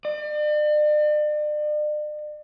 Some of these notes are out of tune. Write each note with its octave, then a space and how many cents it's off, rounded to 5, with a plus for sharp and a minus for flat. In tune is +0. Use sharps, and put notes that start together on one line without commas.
D5 +40